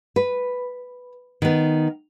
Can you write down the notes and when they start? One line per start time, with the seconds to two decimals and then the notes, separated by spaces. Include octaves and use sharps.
0.16 B4
1.42 D#3 B3